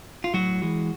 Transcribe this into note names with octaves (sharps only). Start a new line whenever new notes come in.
F4
A2 F#3 F#4
E3 G#3